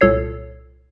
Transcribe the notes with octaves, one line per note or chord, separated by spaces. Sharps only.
C2 A#2 A4 C#5 C7